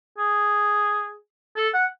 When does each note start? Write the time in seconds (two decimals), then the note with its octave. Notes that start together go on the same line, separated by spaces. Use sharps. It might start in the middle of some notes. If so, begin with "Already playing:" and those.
0.18 G#4
1.57 A4
1.74 F#5